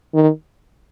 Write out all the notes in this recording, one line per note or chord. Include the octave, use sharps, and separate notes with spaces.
D#3